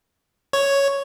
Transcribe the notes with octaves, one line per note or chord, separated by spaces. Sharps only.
C#5